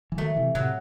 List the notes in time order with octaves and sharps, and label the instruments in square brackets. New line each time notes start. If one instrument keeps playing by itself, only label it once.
[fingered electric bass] E3
[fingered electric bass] D#3 F#3 [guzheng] A3
[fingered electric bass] C3 E3
[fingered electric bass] A2 C3 [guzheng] F#3